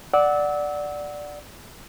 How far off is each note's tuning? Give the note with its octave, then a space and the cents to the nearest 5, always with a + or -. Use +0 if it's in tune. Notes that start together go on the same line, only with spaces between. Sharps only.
D5 +0 F#5 +0 E6 -30